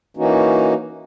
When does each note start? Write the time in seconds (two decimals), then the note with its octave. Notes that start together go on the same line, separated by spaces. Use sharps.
0.17 E3 A#3 C#4 D#4 F#4